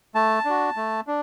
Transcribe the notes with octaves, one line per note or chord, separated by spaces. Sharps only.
A3 A5
D4 F#4
A3
D4